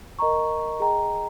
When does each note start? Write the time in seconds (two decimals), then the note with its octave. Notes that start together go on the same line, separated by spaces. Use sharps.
0.19 A#4 D#5 A#5 C#6
0.80 G#4 D#5 G5 A#5